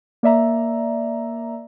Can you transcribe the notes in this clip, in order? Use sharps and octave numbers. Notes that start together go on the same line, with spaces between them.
A#3 D5 E5 A#5